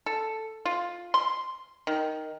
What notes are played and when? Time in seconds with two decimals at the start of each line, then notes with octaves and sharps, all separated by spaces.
0.06 A4
0.65 F4
1.14 C6
1.87 D#3